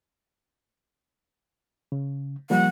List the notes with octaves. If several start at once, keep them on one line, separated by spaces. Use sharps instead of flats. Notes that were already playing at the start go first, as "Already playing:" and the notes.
C#3
F3 G3 A#3 F#5